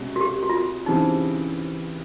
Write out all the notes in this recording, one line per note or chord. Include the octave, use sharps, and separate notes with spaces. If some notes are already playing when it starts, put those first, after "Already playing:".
Already playing: C2 B2 G#3 C#4
F#4
G4
F#4
F4
F#4
C#3 E3 G3 C4 D#4